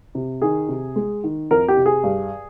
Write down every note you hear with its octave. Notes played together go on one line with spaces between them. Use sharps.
C3
D#3 G#4
C3
G#3
D#3
F2 A#4
G4
C3
G#4
G2